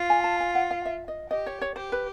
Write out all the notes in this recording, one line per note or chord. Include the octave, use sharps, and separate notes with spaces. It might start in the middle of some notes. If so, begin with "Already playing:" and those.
Already playing: F4
G#5
A5
G#5
F#5
F5
E5
D#5
G4 D#5
C#5
C#5
G4 C5
B4